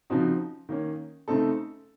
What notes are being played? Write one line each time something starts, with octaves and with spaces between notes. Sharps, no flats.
C#3 F3 C4 D#4 F#4
D#3 A#3 C#4
C#3 A3 C4 D#4 A4